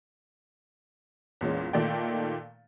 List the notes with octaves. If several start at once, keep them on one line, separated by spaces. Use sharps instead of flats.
E2 A#2 G#3 C#4
A#2 D#3 A3 D5 G5